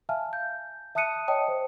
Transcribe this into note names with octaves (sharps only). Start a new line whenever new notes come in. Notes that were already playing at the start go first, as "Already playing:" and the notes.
E5 F5 G#5 A5 F6
G6
E5 A5 D#6 F#6 C#7 D#7
C#5 D#5 G5 A5 D#6
C5